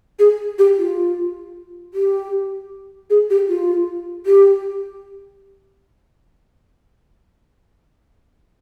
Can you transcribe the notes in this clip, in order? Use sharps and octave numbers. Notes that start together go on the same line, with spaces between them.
G#4
G4
F4
G4
G#4
G4
F4
G4